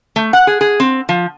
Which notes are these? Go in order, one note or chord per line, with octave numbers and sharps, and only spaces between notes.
A3
F#5
G#4
G#4
C4
F3